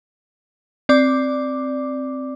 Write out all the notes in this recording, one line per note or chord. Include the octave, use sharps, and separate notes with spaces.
C4 D5 D6